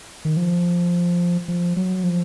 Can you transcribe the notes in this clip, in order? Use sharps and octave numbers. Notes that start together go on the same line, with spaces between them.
D#3
F3
F3
F#3
F3